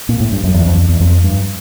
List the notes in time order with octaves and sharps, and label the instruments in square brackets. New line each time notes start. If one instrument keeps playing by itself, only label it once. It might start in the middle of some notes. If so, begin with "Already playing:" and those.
[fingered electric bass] A#2
A2
G2
F#2
E2
F2
F2
E2
F2
G2